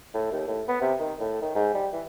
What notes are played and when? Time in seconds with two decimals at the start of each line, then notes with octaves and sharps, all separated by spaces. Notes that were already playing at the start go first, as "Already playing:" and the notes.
0.14 A2
0.31 D#2
0.48 A2
0.68 B3
0.81 C3
0.99 D#3
1.20 A2
1.42 D#3
1.55 G#2
1.74 G3
1.92 E3